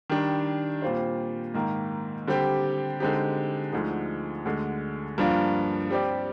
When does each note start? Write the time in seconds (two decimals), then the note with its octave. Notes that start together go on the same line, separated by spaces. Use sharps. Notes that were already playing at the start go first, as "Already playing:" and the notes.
0.10 D#3 G3 D4
0.82 A#2 G3 C4 F4 C5
1.54 G#2 D#3 A#3
2.27 D3 G3 C4 G4
3.00 D3 G#3 C4 D#4 G4
3.72 D2 D3 F3 G#3 D#4
4.45 D2 D3 G#3
5.18 G2 F3 A#3 D4 F4
5.91 G3 C4 G4 D5